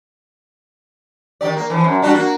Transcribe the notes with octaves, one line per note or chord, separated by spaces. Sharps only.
D#3 G4 D5
A#3
E3 F3
F#2
G3 D4 F#4
A#3 F#4